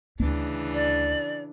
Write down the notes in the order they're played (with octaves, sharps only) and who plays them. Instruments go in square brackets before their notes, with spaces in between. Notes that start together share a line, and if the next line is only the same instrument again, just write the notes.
[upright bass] D2 [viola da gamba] C#3 E3 D4
[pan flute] D5